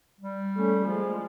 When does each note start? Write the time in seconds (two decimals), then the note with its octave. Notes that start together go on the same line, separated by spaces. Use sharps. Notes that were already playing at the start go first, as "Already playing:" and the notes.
0.21 G3
0.56 A3 C#4
0.85 F3 G#3